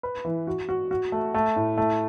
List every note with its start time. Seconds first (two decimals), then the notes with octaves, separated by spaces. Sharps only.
0.03 B4
0.25 E3
0.47 F#4
0.69 F#4
0.91 F#4
1.12 A3
1.34 A3
1.56 A2
1.77 A3